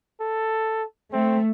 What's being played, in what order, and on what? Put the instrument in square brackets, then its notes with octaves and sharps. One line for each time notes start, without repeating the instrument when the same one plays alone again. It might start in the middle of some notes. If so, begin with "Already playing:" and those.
[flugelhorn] A4
[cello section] A3 [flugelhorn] C4